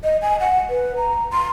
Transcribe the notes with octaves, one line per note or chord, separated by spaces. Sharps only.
D#5
G#5
F#5
B4
A#5
C6